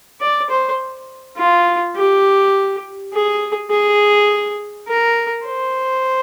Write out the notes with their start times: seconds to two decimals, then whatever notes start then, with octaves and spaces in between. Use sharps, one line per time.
0.20 D5
0.50 C5
1.37 F4
1.96 G4
3.13 G#4
3.71 G#4
4.88 A#4
5.45 C5